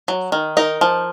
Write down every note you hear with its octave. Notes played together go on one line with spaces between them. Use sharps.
F#3
D#3
D#4 A#4
F3